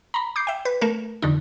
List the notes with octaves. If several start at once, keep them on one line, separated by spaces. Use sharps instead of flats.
A#5 B5
D6 G6 C7
E5 G5
B4
A3 A#4
F2 D3 D#4